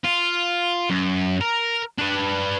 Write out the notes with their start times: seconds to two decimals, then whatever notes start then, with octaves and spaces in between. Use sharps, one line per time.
0.04 F4
0.90 F#2
1.41 A#4
1.99 D4 B4